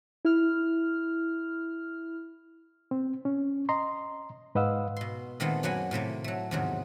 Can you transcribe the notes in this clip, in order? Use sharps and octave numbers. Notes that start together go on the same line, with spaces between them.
E4 F6
C4
C#4
D#5 A#5 C6
G#2 B4 D#5 F5 F#5 E6
B2 C6
A#2 D#3 G#3 A3 B3 C4
F#2 F#3 A#3 F#5 G#5 B5
A2 C3 A3 A#3
F#3 A3
E2 G#2 C3 D#3 F#3